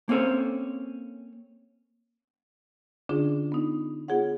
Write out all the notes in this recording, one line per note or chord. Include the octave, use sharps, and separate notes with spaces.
A#3 C4 C#4 A4 C5
D3 C#4 D4 F4 G#4
B3 D#4
B3 F4 G#4 C#5 F#5